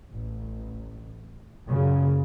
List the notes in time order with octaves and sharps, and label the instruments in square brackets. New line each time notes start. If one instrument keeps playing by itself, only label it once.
[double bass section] A1
F#2 A#2 C#3